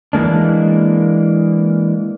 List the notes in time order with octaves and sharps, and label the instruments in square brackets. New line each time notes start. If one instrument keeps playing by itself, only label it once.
[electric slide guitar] E3 G#3 A#3 D4